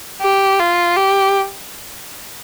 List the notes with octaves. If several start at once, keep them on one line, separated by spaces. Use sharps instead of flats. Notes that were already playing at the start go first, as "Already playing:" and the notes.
G4
F4
G4